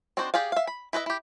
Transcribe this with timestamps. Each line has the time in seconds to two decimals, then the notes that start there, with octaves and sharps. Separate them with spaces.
0.17 C4 D4 D#4 F#4 C5
0.34 G4 G#4 D5 F5
0.52 E5 F5
0.67 B5
0.93 E4 B4 D#5 E5
1.06 E4 G4